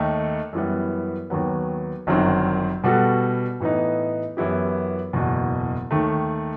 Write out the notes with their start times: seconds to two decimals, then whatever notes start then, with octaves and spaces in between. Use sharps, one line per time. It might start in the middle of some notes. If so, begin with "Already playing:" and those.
Already playing: D#2 D#3 A3 D#4 A4
0.53 F#2 E3 G3 B3
1.30 D#2 D#3 F#3 B3
2.07 G1 F#2 D#3 F#3 C4
2.84 B2 G3 B3 F#4 A4
3.60 A2 E3 B3 D#4
4.37 F#2 E3 B3 E4 G4
5.13 F#1 E2 B2
5.91 D#2 D#3 A3